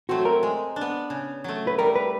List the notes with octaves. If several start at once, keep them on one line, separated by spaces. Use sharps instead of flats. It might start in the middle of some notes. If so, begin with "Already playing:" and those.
F#3 A3 C4 F#4
A#4
G#3
D4
B3
C#3
F#3 A3
B4
G3 A#4
B4